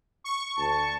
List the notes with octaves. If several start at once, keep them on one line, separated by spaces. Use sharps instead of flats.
C#6
D2 A5